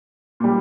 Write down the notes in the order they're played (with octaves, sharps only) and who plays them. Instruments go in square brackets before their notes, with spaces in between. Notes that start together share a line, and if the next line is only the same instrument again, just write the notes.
[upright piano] A#2 G3